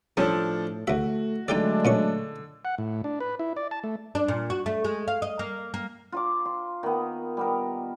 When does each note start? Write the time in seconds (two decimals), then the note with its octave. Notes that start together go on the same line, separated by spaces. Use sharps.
0.17 A2 F3 G3 C#4 D4 A4
0.87 D2 A3 F#4 E5
1.48 D3 F#3 G#3 A3 D4 D#4 G4 D5
1.85 A#2 C#4 C#6
2.65 F#5
2.78 A2
3.04 D4
3.20 B4
3.39 E4
3.56 D5
3.71 A5
3.84 A3
4.15 D4
4.28 A#2
4.50 F#4
4.66 A3
4.84 G#3
5.08 F5
5.22 D#5
5.39 A#3
5.74 A#3
6.12 F4 A#5 D6
6.45 C6
6.83 D#3 B3
7.37 G3 B3 A#4